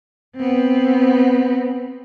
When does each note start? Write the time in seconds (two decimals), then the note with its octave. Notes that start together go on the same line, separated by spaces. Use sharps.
0.36 B3 C4